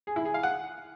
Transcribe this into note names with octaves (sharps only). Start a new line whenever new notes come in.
G#4
E4
G#4
F5
F#5